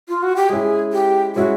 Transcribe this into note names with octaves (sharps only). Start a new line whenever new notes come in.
F4
F#4
G4
G#3 C#4 E4 G#4
G4
G#3 C#4 E4 F#4